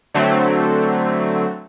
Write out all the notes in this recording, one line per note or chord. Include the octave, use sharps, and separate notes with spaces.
D3 F#3 A3 C4